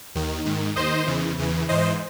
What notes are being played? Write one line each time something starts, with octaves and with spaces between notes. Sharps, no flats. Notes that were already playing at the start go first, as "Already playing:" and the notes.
D#2 D#3
G#2 D#3
D#2 D#3 C5 D#5
E2 C#3 E3
E2 C#3 E3
G#2 E3 C5 D#5